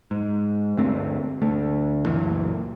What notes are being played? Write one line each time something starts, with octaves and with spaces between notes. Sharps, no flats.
G#2
D2 G2 A3 C4
D2 A3
C#2 F#2 A#2 E3